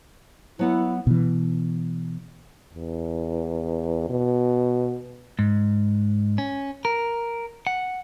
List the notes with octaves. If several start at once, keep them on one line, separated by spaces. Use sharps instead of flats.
F#3 B3 E4 F#5
B2 E3
E2
B2
G#2
C#4
A#4
F#5